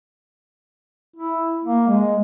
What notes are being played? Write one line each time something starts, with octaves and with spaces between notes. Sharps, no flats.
E4
A#3
G#3